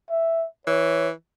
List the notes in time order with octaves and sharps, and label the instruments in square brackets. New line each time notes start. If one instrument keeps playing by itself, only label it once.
[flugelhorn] E5
[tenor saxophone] E3 [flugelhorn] C#5